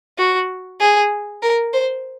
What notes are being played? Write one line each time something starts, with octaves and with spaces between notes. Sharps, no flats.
F#4
G#4
A#4
C5